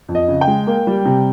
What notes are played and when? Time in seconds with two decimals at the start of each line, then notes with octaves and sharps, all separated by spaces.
0.09 F2
0.15 D#5
0.28 C#3
0.41 G5
0.48 G#3
0.67 A#3
0.87 G3
1.05 C3